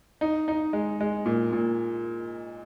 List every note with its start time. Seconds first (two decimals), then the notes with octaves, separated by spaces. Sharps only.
0.21 D#4
0.48 D#4
0.73 G#3
1.01 G#3
1.26 A#2
1.53 A#2